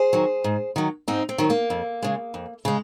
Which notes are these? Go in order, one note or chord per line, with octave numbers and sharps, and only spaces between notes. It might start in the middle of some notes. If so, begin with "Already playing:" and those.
Already playing: G#4 C5
D#3 F#3
G#2
D#3 F#3
G#2 C4 D#4
C4
D#3 F#3
A#3
F2
C#3 G#3
F2
C#3 G#3